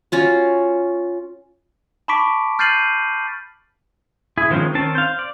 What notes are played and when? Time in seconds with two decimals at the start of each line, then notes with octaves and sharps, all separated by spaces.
0.12 C#4 F4 F#4
2.08 A5 B5 C#6 D6 B6 D7
2.59 F6 G6 A6 C7 D#7 F#7
4.38 E4 G#4
4.50 D#3 F3 G#3 C4 C#4
4.74 D#3 C4 C#4 A5
4.95 C5 F5
5.19 D5